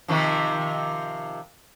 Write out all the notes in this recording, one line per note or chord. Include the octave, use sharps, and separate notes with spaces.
C3 D#3 F3